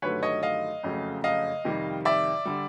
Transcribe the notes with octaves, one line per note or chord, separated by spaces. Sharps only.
G1 G2 D#3 F#3 A3 B4 C#5
C#5 D#5
D#5 F5
F#1 F2 C#3 F#3 A3
D#5 F5
F2 C3 D#3 G3
D5 E5
D3 G3